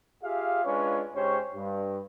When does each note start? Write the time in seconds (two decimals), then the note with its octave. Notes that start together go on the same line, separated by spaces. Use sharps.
0.23 F4 G4 G#4 E5 F5
0.65 G#3 C#4 D4 F4 B4 C#5
1.14 G#2 C#4 G4 C5 C#5
1.55 G2